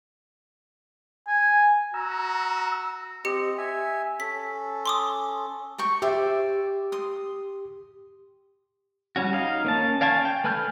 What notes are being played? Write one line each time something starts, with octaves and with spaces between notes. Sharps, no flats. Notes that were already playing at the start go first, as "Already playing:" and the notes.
G#5
F#4 A#5 E6
C4 G4 D#5 C#7
E5 G#5
C#4 A4 B6
C6 D6 D#6
A#4 G5 C#6
G4 C5 D5 E5
C6 D#6
G3 C#4 F#4
D#4 F5
A#3 C#4 A5
D5 F5 G#5 A5 C#6
G5
A3 B4 G#5 F6 G6